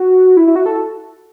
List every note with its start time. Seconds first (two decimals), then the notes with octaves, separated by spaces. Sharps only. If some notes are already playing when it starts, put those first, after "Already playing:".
Already playing: F#4
0.37 E4
0.47 E4
0.56 F#4
0.66 A4